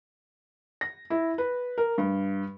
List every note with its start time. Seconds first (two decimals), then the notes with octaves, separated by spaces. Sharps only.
0.81 A#6
1.10 E4
1.38 B4
1.78 A#4
1.98 G2